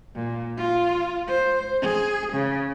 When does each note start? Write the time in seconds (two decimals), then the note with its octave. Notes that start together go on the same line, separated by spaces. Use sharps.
0.15 A#2
0.57 F4
1.28 C5
1.82 G#4
2.32 C#3